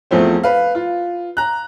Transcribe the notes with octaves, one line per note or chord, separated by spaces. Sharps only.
E2 F3 A3 C4
B4 F5
F4
A#5 F#6